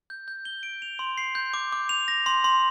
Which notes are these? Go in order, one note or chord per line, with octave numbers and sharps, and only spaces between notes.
G6
G6
G7
D7
F7
C6
C7
G6
D6
D6
F7
A#6
C6
C6